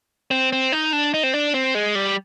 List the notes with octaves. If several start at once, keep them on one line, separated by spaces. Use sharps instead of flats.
C4
C4
D#4
D4
D#4
C4
D4
C4
G#3
G3